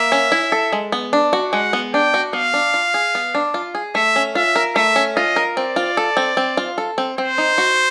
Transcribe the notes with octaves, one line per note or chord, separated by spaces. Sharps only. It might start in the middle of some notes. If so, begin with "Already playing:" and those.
Already playing: A#3 E5
C#4
E4
A4
G#3
B3
D4
F#4
G#3 F#5
B3
D4 G5
F#4
B3 F5
D4
F4
G#4
B3
D4
F4
G#4
A3 E5
C#4
F4 E5
A#4
A3 E5
C#4
F4 D#5
A#4
C4 D5
F4
A4
C4
C4
F4
A4
C4
C4 C5
D#4
F#4